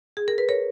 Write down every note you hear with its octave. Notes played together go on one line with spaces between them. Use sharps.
G#4
A#4
B4
A#4 C#5